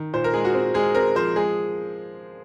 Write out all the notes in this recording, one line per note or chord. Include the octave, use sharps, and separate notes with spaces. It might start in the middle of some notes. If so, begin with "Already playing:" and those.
Already playing: D#3
A#2 C5
A#4
G#3 G#4
F#4
C4
G#3 G#4
C4 A#4
F3 C5
G#3 G#4